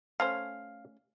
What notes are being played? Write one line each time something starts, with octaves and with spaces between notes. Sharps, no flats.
A3 C#4 C5 F5